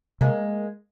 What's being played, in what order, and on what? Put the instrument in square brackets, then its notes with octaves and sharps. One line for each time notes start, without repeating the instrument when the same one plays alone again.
[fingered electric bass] C3 [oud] G#3 A#3